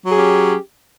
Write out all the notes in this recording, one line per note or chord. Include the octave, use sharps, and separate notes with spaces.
F#3 C#4 G4 G#4